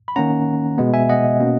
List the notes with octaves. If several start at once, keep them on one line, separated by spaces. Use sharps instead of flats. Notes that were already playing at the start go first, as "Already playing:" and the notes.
B5
D#3 A#3 C#4 F#5 A#5
B2 G#3 B3
E5 G#5
D#5 F#5
B2 A#3 C#4